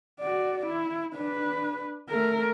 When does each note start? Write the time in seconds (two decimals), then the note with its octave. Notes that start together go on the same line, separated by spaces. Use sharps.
0.20 F#4 D5
0.66 E4
1.15 D4 B4
2.10 A3 A#4